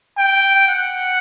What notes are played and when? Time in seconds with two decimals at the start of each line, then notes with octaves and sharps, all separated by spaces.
0.18 G5
0.68 F#5